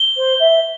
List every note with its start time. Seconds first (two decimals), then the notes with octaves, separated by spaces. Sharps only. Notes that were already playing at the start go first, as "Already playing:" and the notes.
Already playing: G7
0.16 C5
0.39 E5